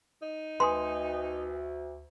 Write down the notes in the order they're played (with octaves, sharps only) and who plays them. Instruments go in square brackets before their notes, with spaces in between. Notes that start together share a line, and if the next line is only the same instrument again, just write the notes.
[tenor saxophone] D#4
[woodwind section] D2 [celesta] B4 G#5 D#6 [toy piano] C6